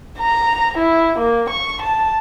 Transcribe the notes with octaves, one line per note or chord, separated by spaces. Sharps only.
A#5
E4
A#3
C#6
A5